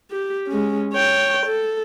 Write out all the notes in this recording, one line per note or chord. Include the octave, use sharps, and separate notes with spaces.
G4
G#3 C#4
C#5 G5
A4